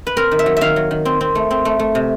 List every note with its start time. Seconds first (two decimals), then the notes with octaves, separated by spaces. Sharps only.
0.07 B4
0.17 C4 A#4
0.31 D#3
0.39 E5
0.46 F#3
0.57 D#3 E5 F5
0.76 F#3
0.91 D#3
1.05 C4
1.21 C4
1.35 A3
1.51 C4
1.65 A3
1.79 A3
1.95 C3